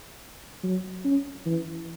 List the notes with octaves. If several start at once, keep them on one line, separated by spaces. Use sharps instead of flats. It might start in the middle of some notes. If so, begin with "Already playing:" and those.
F#3
C#4
E3